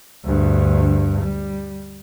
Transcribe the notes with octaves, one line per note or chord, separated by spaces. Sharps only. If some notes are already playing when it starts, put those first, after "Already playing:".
D2 G2
G3